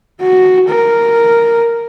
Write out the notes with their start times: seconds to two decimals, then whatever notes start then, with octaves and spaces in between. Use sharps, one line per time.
0.21 F#4
0.69 A#4